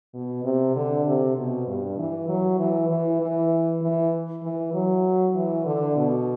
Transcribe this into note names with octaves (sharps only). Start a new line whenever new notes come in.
B2
C3
D3
C3
B2
G2
E3
F#3
E3
E3
E3
E3
E3
F#3
E3
D3
B2